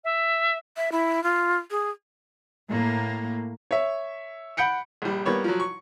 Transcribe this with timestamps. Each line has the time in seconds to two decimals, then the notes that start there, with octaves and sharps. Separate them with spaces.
0.04 E5
0.77 E5
0.92 E4
1.24 F4
1.71 G#4
2.68 A2 A#3
3.71 C#5 E5
4.57 F#5 B5 G6 C#7 D7
5.02 A#1 G3
5.25 G3 A#3 B3 C#5
5.44 F3 F#3
5.60 C#6